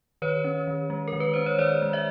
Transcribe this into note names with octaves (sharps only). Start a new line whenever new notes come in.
D#3 B4 C#5
C#4
D#3
G#3
A#4
D#3
B4
C#4 C5
C#5
D#3 C5 D5
G#3
D5 E5